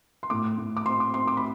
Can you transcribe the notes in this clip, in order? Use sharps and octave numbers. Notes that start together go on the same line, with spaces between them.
C6
A2 D6
A2
D6
C4 C6
D6
C4 C6
D6
B5